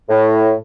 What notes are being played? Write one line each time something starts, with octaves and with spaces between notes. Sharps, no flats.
A2